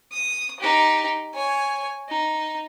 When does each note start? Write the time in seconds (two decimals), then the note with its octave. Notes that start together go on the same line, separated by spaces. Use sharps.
0.12 D#6
0.59 D#4 G4
1.34 C#5 G#5
2.09 D#4